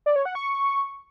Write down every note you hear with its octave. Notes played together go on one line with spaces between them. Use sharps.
D5
C#5
F#5
C#6